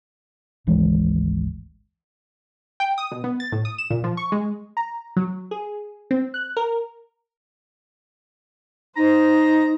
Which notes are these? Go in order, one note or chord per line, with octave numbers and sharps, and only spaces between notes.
G#1 D2 E3 G#3
G5
D#6
B2
B3
A6
A2
D#6
E7
A#2
F3
C#6
G#3
A#5
F#3
G#4
C4
F#6
A#4
D#4 C5 A#5